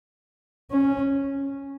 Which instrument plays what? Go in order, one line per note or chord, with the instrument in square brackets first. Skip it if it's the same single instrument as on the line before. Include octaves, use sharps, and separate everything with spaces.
[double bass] C#4